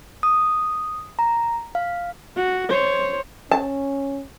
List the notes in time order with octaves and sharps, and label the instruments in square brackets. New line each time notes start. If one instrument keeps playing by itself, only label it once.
[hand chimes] D#6
A#5
F5
[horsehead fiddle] F#4
C5 C#5
[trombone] C#4 [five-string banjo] A5